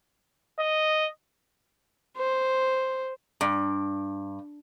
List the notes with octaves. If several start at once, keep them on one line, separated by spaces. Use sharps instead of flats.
D#5
C5
G2